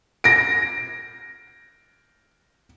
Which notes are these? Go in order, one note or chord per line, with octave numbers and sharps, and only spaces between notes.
A#6 D7